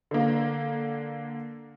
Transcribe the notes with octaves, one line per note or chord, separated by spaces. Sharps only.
D3 A#3